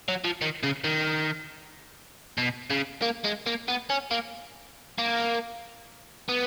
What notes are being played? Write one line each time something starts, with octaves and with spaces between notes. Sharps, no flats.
F#3
F3
D#3
C#3
D#3
B2
C#3
A#3
G#3
A#3
B3
C#4
A#3
A#3
B3